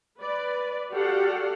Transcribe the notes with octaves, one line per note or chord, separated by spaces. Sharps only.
B4 D5
F#4 G4 A4 D5 F5 F#5